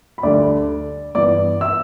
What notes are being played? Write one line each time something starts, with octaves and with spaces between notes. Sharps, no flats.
B5
D2 D3 G3 D4 D5 D6
G2 E3 B3 E4 D5 D6
E5 E6